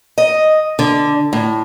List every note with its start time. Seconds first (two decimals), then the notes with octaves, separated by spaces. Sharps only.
0.18 D#5
0.79 D3
1.33 A2